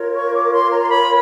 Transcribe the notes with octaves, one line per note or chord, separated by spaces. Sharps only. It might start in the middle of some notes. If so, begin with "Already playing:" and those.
Already playing: F4 A#4 C#5
C#6
D6
C6
A#5
C6
B5